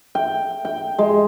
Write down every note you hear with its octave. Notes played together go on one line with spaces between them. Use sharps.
G5
G5
G#3